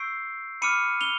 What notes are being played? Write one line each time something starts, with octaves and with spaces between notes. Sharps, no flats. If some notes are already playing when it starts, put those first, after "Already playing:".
Already playing: C#6 E6 G6 C7 D7
B5 D6 F6 C#7 D#7
F7 G7